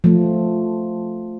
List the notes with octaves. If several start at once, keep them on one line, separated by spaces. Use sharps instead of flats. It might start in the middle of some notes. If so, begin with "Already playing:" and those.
F3 A3